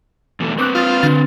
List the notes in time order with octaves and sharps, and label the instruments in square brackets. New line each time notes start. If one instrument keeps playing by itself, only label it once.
[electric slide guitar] E2 B2 A3
[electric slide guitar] C4 B4 C5 [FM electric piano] C#6 D6 F#6
[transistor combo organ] F4 [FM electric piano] D#6 E6 A6
[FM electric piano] D3 C6 A6